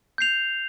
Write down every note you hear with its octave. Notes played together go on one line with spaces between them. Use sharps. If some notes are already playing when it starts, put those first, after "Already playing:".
G6 C7 F7